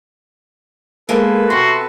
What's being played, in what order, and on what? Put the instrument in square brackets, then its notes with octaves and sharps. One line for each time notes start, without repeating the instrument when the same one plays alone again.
[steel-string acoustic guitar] G#3 A#3 [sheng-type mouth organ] A4 B4
[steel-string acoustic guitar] C3 [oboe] F#4 [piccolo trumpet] C6